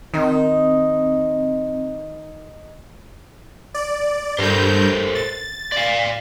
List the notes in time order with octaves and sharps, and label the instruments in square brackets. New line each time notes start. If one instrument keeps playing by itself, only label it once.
[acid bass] D#3 [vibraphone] C4 [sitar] D#4
[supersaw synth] D5
[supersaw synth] G2 G6 [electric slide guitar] A4 A#4 C5
[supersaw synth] A6
[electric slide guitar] D5 F5